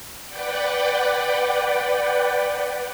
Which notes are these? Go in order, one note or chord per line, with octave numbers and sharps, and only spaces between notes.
B4 D5 F#5 G5